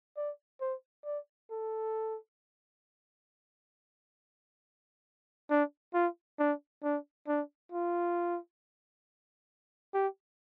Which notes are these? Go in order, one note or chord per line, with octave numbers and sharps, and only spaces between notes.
D5
C5
D5
A4
D4
F4
D4
D4
D4
F4
G4